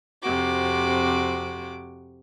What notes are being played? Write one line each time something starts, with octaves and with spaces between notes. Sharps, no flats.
F2 C3 F#4 D6